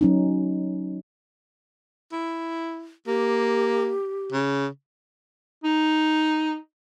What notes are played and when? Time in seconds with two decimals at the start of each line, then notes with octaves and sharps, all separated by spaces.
0.01 F#3 C#4 D#4
2.12 E4
3.07 A#3 G4
4.32 C#3
5.64 D#4